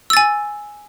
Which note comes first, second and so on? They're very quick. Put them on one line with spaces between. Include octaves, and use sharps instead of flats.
E6 A6 G#5